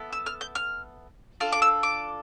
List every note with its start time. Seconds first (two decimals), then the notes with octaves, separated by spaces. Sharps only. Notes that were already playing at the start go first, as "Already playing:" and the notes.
Already playing: B3 E4 A4
0.12 E6
0.26 F6
0.41 G6
0.55 F6
1.40 D4 F4 A4 F6
1.52 D6
1.62 E6
1.83 D6